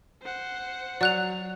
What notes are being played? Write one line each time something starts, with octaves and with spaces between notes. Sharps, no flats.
C5 F#5
F#3 D5 F#6 F7